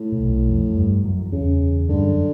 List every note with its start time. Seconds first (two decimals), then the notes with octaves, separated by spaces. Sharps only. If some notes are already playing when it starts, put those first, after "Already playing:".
Already playing: A2
0.12 A#2
0.20 B1 B2
0.48 F2 F3
0.70 F#3
0.76 G2 G3
1.04 F#2 F#3
1.26 F3
1.32 E2 C#3 E3
1.89 G2 D3 G3
2.07 F#2 F#3